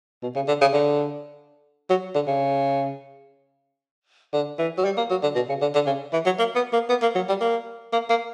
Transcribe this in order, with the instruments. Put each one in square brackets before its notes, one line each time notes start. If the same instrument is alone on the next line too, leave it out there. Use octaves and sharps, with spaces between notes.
[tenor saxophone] B2
C#3
D3
C#3
D3
F#3
D3
C#3
D3
E3
F#3
G3
A#3
F#3
D3
B2
C#3
D3
D3
C#3
E3
F#3
A#3
B3
A#3
B3
A#3
F#3
G3
A#3
A#3
A#3